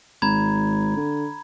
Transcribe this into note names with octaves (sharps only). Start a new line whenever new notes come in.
G#1 A#5 B5 G#6
D3